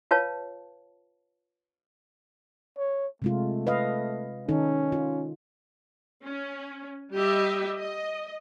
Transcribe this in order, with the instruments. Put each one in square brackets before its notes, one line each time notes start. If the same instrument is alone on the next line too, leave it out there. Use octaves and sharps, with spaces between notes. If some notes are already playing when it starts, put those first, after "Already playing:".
[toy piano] F4 B4 C#5 F5 A5
[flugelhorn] C#5
[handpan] C3 G#3 F4 [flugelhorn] A3
[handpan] B4 D#5 F5
[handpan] D#3 D#4 A4 [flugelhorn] C#4
[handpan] F4
[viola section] C#4
G3 G4 D#5 E5
D#5